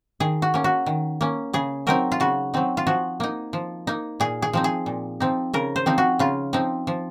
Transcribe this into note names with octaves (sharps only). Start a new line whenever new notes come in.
D#3 G#4
F#4
A#3 C#4
F#4
D#3
A#3 C#4
C#3 G#4
F#3 C4 D#4 A#4
F4
C#3 F#4
F#3 C4 D#4
F4
F3 F#4
A#3 D#4
F3
A#3 D#4
A#2 G#4
G#4
F3 C4 D#4
G#4
A#2
F3 C4 D#4
C#3 A#4
C5
F3 C4 D#4
F#4
C#3 F4
F3 C4 D#4
F3